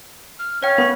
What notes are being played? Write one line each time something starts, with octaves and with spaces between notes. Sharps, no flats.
F6
C#4 C#5 F5 G5
B3 A#4 C#6